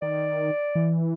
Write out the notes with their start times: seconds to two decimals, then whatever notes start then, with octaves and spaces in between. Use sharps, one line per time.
0.02 D#3 D5
0.75 E3